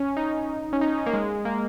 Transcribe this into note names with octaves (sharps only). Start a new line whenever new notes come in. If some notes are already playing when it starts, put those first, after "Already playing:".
Already playing: C#4
D#4
C#4
D#4
C#4
A#3
G#3
A#3